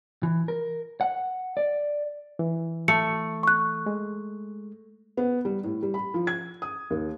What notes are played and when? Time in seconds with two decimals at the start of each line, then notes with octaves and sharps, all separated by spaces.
0.23 E3
0.48 A#4
1.01 F#5
1.57 D5
2.39 E3
2.88 A3 C#7
3.43 C#6 F#6
3.86 G#3
5.17 B3
5.45 G3
5.64 A2
5.83 G3
5.94 B5
6.14 F3
6.27 G#6
6.62 D#6
6.90 D#2